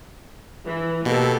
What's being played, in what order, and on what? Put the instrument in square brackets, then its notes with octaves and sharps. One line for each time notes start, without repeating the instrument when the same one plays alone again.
[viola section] E3
[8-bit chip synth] B2 [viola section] A#3 G4 A4